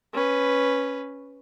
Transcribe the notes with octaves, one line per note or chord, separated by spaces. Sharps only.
C#4 B4